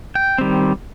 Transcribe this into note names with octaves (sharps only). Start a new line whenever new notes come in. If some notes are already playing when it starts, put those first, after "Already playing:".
G5
D#3 G3 C4